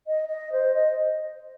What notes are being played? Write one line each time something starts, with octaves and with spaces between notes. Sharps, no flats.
D#5
D#5
C5
D#5